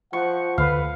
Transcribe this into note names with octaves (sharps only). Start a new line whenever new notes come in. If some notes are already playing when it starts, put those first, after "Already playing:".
F3 F#5 C#6
D2 B4 F5